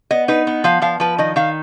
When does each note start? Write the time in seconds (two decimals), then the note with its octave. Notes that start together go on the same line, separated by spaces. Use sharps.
0.11 B3 D#5
0.28 D#4 B4
0.47 B3
0.64 F3 F5
0.82 F3 F5
1.00 F3 B4
1.18 D#3 D#5
1.36 D#3 F5